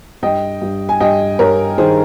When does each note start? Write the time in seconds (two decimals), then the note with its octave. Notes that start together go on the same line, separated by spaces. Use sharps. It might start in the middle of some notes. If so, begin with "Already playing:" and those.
0.23 G2 D#5 G5
0.62 G2
0.89 G#5
1.00 G2 D#5 G5
1.39 G2 A#4 C#5
1.78 D#3 G#4 C5